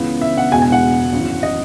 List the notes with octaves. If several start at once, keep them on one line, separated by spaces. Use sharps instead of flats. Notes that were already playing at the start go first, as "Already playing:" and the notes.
Already playing: C#2 C#3 E3 B3
E5
F#5
E1 E2 B2 G#3 G#5
G#5
F#5
G#1 F#2 E3
D#5